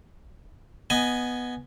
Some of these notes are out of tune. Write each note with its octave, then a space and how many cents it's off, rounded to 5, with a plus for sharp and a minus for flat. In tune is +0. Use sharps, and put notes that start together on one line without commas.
B3 +0 D#5 +0 G#5 +5